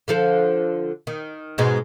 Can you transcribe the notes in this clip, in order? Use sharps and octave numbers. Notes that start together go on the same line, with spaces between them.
D3 F3 A4
D#3
G#2 B2 G#3